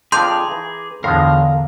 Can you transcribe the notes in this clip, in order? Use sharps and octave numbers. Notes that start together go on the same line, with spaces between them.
F2 F3 D4 G#4 A#5 C6 D6 G6
E3
E2 A2 D3 F3 G#3 A#4 F5